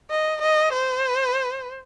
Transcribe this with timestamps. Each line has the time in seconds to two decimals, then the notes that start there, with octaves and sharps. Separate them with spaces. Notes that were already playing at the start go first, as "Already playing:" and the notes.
0.10 D#5
0.42 D#5
0.73 C5